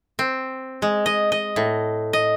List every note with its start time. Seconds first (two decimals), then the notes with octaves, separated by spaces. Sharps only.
0.19 C4
0.82 G#3
1.06 D#5
1.32 D#5
1.56 A2
2.13 D#5